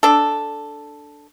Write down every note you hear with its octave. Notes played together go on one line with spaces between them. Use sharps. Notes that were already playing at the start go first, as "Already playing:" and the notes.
D4 A4